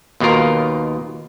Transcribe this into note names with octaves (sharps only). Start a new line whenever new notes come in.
D#2 B2 D#3 F4 A#4